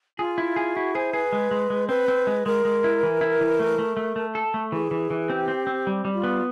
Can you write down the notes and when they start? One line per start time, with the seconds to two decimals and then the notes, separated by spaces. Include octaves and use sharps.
0.19 F4 G#4
0.38 E4
0.56 G#4
0.75 E4 F#4
0.95 G#4 C5
1.13 G#4 B4
1.33 G#3
1.51 G#3
1.70 G#3
1.89 C4 B4
2.08 C4
2.27 G#3
2.46 G#3 A#4
2.65 G#3
2.84 E4
3.03 E3
3.21 E4
3.41 E3
3.59 A3
3.79 A3
3.97 A3
4.16 A3
4.35 A4
4.54 A3
4.72 E3 G#4
4.91 E3
5.11 E3
5.30 C4 G4
5.48 C4
5.67 C4
5.87 G3
6.05 G3
6.14 F4
6.24 B3